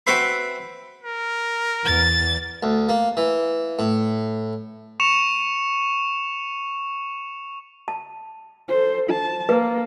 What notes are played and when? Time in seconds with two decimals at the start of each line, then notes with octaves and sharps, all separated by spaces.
0.07 C4 F#4 B4 C5 E5 B5
1.04 A#4
1.85 E2 A6
2.63 D2
2.89 A#3
3.17 E3
3.79 A2
5.00 C#6 C#7 E7 F7
7.88 A5
8.68 A4 C5
9.10 A5
9.49 A#3 B4